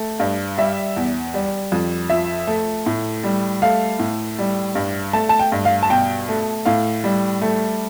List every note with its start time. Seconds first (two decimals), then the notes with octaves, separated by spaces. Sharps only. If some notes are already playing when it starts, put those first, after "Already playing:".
Already playing: A3
0.20 G2
0.58 G3 E5
0.97 E2
1.34 G3
1.72 F2
2.10 F3 E5
2.47 A3
2.86 A2
3.24 G3
3.62 A3 F5
3.99 A2
4.39 G3
4.75 G2
5.13 A3 A5
5.29 A5
5.39 G5
5.52 G2
5.65 F5
5.83 A5
5.89 B2 G5
6.29 A3
6.65 A2 F5
7.04 G3
7.42 A3